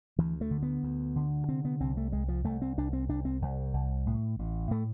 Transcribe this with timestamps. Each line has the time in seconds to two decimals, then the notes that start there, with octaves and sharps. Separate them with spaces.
0.18 D2 E3
0.41 A3
0.51 D3
0.63 B3
0.83 D2
1.16 D3
1.49 C3 C4
1.65 B3
1.80 C2 C4
1.97 A3
2.12 C2 G#3
2.28 F3
2.44 C2 A3
2.62 C4
2.78 C2 D4
2.93 C4
3.09 C2 D4
3.25 C4
3.42 C2
3.74 C2
4.07 A2
4.39 A1
4.71 A2 A3